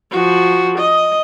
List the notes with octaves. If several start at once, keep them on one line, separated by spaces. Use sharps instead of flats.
F3 F#4
D#5